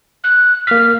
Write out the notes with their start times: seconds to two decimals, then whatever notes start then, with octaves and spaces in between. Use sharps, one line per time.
0.24 F#6
0.67 A#3 F6 B6